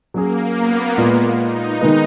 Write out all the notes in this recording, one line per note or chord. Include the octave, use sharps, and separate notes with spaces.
F#3 A#3 C#4 G#4
B3
A#2 G#3 B3 F4
D#4
D#3 G#3 B3